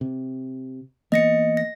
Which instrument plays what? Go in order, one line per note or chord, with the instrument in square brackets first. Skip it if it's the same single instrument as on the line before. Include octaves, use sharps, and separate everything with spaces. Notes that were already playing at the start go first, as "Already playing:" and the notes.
[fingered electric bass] C3
[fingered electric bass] E3 A#3 B3 [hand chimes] D#5 A#6 C#7
[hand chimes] A#6